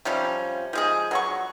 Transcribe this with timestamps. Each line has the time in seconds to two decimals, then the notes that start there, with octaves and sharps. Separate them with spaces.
0.05 C3 F3 G3 C#4
0.73 F3 G#3 G#4
1.11 F#3 F#4 C#6